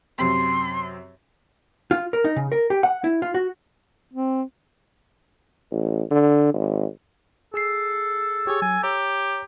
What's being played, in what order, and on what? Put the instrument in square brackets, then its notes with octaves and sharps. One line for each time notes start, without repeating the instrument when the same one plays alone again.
[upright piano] F#2 C3 C4 [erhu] C6
[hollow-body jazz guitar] F4
A#4
D#4
C#3
A#4
G4
F#5
E4
F4
F#4
[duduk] C4
[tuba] A1
D3
G#1
[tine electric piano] G#4 E6 C7 [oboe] A4
[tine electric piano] G4 G#4 [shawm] C#5
[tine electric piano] F#3 [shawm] G#5
[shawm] G4 [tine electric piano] C#5 A#5